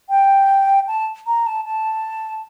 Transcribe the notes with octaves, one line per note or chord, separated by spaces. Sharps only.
G5
A5
A#5
A5
A5